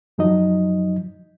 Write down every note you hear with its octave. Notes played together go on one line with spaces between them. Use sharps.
F#2 F3 F#3 D#4 D#5